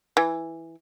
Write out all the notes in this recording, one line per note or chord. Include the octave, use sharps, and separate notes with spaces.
E3